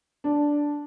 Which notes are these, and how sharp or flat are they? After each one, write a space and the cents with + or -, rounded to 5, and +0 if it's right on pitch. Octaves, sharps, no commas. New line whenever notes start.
D4 -5